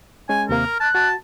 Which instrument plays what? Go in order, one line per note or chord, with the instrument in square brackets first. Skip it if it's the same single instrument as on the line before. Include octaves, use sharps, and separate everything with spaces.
[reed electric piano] G#3 C#4 [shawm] G#5
[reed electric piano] D#2 C3 A#3 [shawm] A#4
[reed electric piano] F6
[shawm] A5 [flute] F#6
[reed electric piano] F#4 [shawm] A5